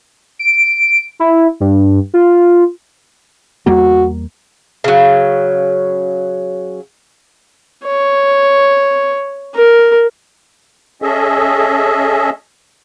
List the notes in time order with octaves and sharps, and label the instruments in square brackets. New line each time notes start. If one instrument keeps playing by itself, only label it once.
[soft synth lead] D7
E4
G2
F4
[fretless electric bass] E2 G3 A#3 [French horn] F#4
[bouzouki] C#3 F#3
[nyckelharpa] C#5
A#4
[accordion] C#4 G#4 A4 D#5 E5